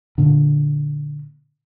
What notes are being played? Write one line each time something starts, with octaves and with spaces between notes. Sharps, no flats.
A#2 D3